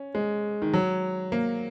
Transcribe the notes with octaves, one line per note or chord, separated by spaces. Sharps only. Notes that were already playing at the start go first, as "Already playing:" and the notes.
Already playing: C#4
G#3
D#3
F#3
A#3